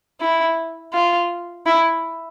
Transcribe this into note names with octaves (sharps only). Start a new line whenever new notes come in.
E4
F4
E4